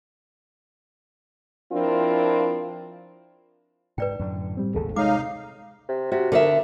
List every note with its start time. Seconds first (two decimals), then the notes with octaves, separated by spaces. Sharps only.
1.71 F3 C4 D4 E4 F4 A#4
3.98 G#2 B4 D5 G5
4.19 F#2 A2 D3
4.57 A2 G3 C4
4.75 G#1 D#2 C#3 G#4 A4
4.96 C3 G#3 D#4 C#5 F5 D6
5.89 C3
6.12 C3 F#4
6.32 D2 D3 A#4 E5